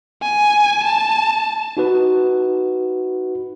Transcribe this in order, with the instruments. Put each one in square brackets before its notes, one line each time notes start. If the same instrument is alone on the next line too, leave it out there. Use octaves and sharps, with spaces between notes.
[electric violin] G#5
A5
[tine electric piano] D#4 F#4 B4